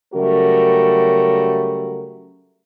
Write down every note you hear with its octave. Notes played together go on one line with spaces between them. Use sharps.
C#3 F#3 G3 A3 F#4 A#4